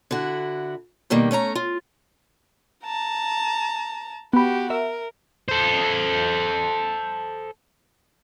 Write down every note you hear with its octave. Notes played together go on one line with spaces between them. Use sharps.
D3 E4 F#4
B2 D#3 G3 A#3
A3 C#4 C#5 A#5
F4
A5 A#5
B3 F#4 G4 B5
A#4 E5
A4 C5